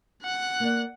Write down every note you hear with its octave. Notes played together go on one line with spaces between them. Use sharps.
F#5 F#6
A#3 D5